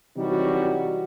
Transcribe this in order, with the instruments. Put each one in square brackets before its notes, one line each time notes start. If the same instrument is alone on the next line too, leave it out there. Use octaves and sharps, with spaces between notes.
[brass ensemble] C3 E3 F#3 G3 D#4 F#4